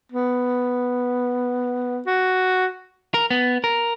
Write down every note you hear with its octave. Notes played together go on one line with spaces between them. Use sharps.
B3
F#4
A#4
B3
A#4